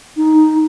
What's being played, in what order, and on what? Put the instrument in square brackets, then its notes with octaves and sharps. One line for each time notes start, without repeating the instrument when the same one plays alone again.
[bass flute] D#4